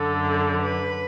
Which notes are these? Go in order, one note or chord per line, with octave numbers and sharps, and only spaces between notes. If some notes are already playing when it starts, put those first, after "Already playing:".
Already playing: F#2 D3 A4
B4